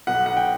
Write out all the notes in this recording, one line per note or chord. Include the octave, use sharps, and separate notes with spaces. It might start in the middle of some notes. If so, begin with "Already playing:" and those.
B1 F#5
F#5
G5